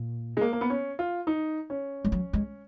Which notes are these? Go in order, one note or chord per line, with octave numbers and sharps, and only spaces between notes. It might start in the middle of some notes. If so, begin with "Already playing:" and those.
Already playing: A#2
G#3
A#3
A#3
B3
C#4
F4
D#4
C#4
G#3
F#3
G#3